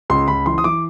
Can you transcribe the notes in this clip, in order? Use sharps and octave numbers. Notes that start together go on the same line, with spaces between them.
C#2 C6
C#2 B5
E3 C6
D#6
E3 D6